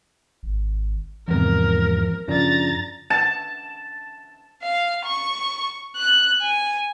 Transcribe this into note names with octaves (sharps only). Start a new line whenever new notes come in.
G#1
E2 G#2 C3 F3 A#4
F#2 C#3 F3 D4 A#5 A6
A5
F5
C#6
F#6
G#5